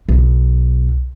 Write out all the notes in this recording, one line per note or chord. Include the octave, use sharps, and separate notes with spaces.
B1